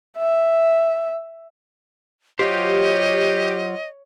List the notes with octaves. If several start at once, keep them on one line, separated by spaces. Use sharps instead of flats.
E5
F#3 F4 G4 C5 C#5 D#5